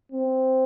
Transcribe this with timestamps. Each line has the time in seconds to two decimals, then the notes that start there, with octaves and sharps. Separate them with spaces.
0.12 C4